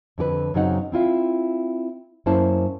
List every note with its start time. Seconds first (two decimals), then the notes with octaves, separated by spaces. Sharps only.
0.18 F2 D3 G4 B4
0.54 F#2 C#3 F#3 C4 D#4 F#5
0.92 C4 E4 F4 E5
2.26 F#2 A#3 C#4 E4 C5 A5